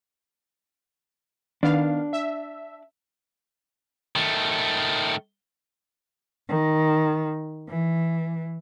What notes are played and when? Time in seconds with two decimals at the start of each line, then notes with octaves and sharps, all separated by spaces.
1.63 D#3 B3 D4 F5
2.13 E5
4.16 D#3 A3
6.48 D#3
7.69 E3